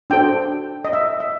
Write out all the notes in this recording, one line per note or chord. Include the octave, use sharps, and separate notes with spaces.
D4 F#4 A4 C5 G5
D#5
E5
E5